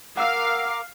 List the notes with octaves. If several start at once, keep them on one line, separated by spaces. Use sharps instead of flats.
A#4 F5 F#5 D6 E6 F6